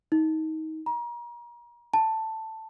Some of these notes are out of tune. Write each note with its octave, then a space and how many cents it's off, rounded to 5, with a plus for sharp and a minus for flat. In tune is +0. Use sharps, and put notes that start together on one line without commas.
D#4 +25
A#5 +35
A5 +10